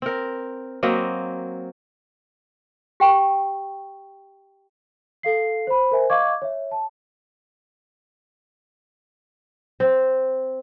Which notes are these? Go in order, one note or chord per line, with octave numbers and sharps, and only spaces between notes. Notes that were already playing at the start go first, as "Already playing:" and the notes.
C4 A#4
F#3 A#3 C4 D#5
G4 G5 C#6
A4 F5 C7
C5 B5
A#4 C5 E5 G#5
D#5 F5 C#6 D6 G#6
C#5 E5
A5
C4